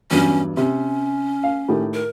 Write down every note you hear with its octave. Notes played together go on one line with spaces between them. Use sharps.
E2 G2 F#3 C#4
C3 C#4
F5
A2 D#3 G4
A#4